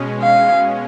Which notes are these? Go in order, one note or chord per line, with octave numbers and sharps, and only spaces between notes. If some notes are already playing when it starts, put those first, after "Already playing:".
Already playing: B2 G#3 C#4
F5